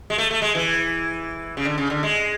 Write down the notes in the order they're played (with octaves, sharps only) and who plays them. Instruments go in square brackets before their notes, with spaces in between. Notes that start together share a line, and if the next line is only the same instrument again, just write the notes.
[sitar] G#3
A3
A3
G#3
E3
C#3
D3
C#3
D3
G#3